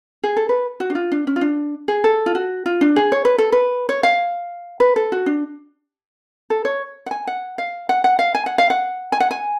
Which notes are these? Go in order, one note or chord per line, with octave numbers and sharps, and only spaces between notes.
G#4
A4
B4
F#4
D4
F4
D4
C#4
F4
D4
G#4
A4
F4
F#4
F4
D4
G#4
C#5
B4
A4
B4
C#5
F5
B4
A4
F#4
D4
A4
C#5
F#5
G#5
F#5
F5
F#5
F#5
F5
G#5
F#5
F5
F#5
G#5
F#5
G#5